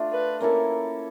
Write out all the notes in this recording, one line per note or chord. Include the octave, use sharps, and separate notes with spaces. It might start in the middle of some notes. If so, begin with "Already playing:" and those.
Already playing: A3 D4 F4
B4
A#3 C#4 E4 A4 A#4